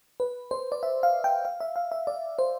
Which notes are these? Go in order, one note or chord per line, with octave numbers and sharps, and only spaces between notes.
B4
C5
D5
E5
F5
G5
F5
E5
F5
E5
D5
C5